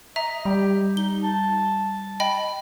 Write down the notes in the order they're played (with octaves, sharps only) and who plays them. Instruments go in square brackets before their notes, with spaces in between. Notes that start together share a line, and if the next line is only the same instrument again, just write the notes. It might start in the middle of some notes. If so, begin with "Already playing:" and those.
[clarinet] D#5 [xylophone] E5 A#5
[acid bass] G3 [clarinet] G4
[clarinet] D#4 [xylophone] G7
[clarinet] A5
[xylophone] D#5 G5 B5